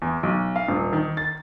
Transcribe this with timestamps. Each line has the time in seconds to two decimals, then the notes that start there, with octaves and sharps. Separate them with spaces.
0.02 E2
0.23 B1
0.56 F5
0.68 D#1
0.93 D#3
1.17 A6